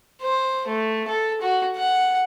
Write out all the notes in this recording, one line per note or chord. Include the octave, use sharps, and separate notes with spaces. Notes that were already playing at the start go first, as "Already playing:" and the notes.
C5
A3
A4
F#4
F#5